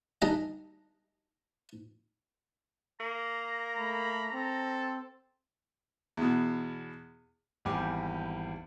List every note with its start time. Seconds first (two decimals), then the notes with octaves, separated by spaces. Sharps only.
0.22 D#3 G3 D4 D#5 G#5 A#5
3.00 A#3 A#5
3.78 A3 B5
4.33 C4 A4
6.17 E2 B2
7.65 G#1 E2 G3 G4 G#5 D6